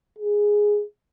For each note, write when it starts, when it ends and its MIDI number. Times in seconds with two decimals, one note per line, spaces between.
0.19 0.83 68